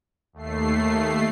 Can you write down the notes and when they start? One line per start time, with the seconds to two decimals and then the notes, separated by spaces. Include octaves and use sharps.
0.33 D#2 A3 C7